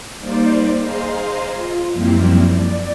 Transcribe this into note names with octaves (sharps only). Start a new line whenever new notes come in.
G3 A#3 D#4 C5 D5
G#4 C5 D#5 F5 A#5 C6
F4
F#2 F3 G3 A#3 C4 E4
D5